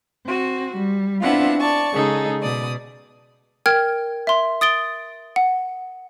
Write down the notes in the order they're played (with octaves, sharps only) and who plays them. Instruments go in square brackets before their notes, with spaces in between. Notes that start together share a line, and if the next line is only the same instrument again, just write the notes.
[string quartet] C4 F#4
G3
B3 C4 D4 E4 F4 F#5
D5 A5 C#6
C#3 G#3 D#4 G#4 A4
B2 D5 D#6
[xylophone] A#4 G5 F6 G#6
E5 C6
D#6 A6 D7 G7
F#5